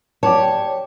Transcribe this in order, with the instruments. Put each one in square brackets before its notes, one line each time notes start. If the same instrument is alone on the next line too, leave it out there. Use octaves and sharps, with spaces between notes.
[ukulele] G4 D5 A5 [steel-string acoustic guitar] C#5